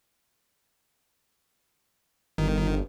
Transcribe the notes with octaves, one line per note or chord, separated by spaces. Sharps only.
G1 D#3